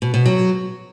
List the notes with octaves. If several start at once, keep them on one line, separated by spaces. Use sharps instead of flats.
B2
B2
F#3